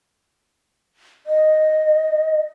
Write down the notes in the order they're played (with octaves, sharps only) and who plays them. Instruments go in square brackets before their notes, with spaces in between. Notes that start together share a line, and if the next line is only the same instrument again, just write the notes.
[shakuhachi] D#5